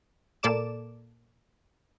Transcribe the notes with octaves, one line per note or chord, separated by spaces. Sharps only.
A#2 A#3 A4 D5 D6 E7